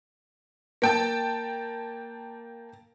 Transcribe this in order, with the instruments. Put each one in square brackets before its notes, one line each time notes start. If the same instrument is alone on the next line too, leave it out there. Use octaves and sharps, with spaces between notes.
[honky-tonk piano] A#3 G5 A5